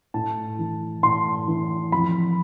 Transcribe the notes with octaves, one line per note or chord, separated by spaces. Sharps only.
A2 A5
E3
A2 C6
E3
F2 B5